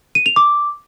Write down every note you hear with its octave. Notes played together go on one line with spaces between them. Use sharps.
D#7
F7
D6